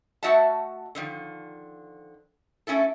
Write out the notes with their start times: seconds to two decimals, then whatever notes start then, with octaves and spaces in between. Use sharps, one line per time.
0.23 A3 F#4 D#5 E5 F#5 A5
0.95 D3 D#3 F3
2.67 A3 C#4 E4 A4